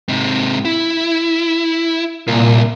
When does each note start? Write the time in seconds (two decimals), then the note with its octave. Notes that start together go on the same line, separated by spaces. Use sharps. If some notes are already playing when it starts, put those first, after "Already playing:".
0.09 G#2 C3
0.65 E4
2.27 C2 A#2